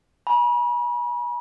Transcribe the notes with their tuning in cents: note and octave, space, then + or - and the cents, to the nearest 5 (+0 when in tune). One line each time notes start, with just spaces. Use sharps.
G#5 +25 B5 -40